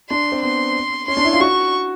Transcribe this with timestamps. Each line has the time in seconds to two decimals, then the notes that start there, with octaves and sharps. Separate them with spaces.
0.10 D4 C6
0.32 C4
0.43 B3 C6
1.08 C#4 C6
1.17 D4
1.25 E4
1.33 F4
1.40 F#4 C#6